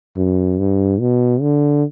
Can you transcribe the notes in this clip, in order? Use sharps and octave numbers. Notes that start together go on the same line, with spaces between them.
F#2
G2
B2
D3